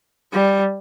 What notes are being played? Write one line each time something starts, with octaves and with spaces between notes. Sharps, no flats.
G3